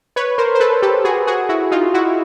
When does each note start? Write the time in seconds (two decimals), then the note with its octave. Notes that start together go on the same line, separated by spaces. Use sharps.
0.16 B4 C#5
0.38 A#4 C5
0.55 C5
0.60 A4 B4
0.82 G4 A4
1.04 F#4 G#4
1.27 F#4 G#4
1.49 E4 F#4
1.71 D#4 F4
1.94 E4 F#4